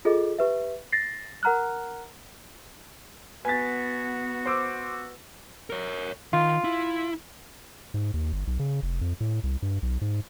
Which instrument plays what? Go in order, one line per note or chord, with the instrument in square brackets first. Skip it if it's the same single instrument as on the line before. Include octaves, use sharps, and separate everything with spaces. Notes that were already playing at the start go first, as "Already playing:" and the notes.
[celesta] F4 G#4 A4 D#5
G4 B4 E5
A6 A#6 C7
A#4 F#5 A#5 F6 F#6
[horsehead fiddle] B3 [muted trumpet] F#4 [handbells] B4 B6 [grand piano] G#5 A6
[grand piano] C5 D6 E6
[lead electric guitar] A#4 C#5
[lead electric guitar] D#3 [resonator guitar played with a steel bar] F4
[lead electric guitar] E4
[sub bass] G#2
D#2
G1
B1
C#3
F1
F2
A2
C2
G2
B1
G#2